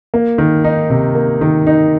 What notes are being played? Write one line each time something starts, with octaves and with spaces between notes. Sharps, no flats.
A#3
D#3
D#4
C3
A#3
D#3
D#4